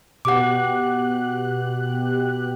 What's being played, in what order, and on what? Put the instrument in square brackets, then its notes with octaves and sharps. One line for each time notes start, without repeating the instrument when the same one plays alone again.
[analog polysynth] B2 G4 F#6 [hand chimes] F#5 D6